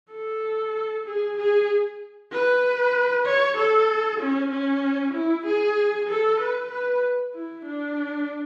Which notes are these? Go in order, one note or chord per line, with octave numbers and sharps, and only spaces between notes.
A4
G#4
G#4
B4
C#5
A4
C#4
C#4
E4
G#4
A4
B4
B4
E4
D4